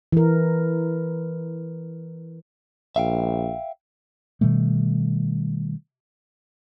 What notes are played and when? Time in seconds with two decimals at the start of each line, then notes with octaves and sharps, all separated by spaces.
0.13 E3 A#4
2.96 A#1 E5 F5 G5
4.41 B2 D#3 G3 A3